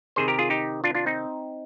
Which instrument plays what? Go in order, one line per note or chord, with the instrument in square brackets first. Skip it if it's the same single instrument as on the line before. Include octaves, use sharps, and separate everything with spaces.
[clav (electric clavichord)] C3 D#3 G#4 C5
G4 A#4
F4 G#4
D#4 G4
D4 F4
D4 F4
C4 D#4